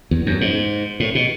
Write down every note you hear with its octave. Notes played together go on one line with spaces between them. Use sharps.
E2
F#2
G#2
A2
B2